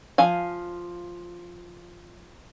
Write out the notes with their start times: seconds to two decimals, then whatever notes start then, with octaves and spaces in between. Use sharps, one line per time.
0.18 F3 F5 G#5